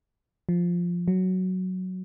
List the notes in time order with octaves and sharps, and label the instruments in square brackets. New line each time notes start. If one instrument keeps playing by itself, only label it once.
[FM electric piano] F3
F#3